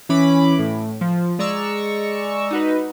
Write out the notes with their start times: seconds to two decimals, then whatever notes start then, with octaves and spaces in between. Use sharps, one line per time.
0.09 E3 C#4 B5 D6
0.59 A2
1.01 F3
1.39 G#3 D5 A#5 C#6 E6
2.51 D#4 F#4 B4